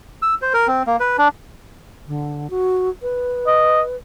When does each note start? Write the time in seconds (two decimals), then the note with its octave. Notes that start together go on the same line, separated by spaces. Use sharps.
0.22 E6
0.42 C5
0.54 A#4
0.67 C4
0.87 A#3
1.00 B4
1.18 D4
2.08 D3
2.50 F#4
3.02 B4
3.47 D#5